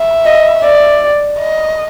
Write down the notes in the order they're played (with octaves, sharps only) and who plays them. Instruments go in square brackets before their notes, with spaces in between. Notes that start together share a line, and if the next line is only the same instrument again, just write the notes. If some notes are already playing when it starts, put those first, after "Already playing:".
Already playing: [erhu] E5
[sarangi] D#5
D5
[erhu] D#5